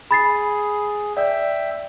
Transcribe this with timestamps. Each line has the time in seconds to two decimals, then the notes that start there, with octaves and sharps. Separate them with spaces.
0.11 G#4 B5 A6 C7
1.17 D5 E5 G5